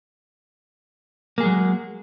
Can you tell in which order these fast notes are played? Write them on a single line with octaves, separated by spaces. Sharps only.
A#3 G#4 G#3 F#3